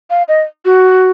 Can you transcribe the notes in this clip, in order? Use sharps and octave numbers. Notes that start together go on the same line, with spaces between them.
F5
D#5
F#4